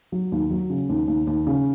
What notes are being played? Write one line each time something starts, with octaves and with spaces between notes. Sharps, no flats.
F#3
D#2
F#3
C#3
D#2
D#2
D#2
C#3